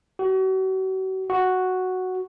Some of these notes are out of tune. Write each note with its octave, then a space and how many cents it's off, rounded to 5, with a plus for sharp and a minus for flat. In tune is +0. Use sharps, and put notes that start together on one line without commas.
F#4 +40
F#4 +0